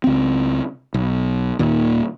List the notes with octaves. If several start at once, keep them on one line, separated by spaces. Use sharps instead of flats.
C#2 C4
B1
D#2 A#2 D#3